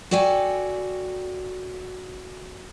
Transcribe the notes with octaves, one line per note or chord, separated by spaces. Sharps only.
F#4 A4 D5 G5 G#5